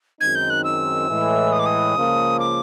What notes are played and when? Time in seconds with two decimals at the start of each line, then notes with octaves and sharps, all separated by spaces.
0.21 F#2 D#3 G#3 C4 D#4 G#6
0.35 G6
0.50 F#6
0.64 E6
1.09 A2 E3 G#3
1.52 D#6
1.59 D6
1.66 D#6
1.96 C#2 C#3 F3 A#3
2.40 D6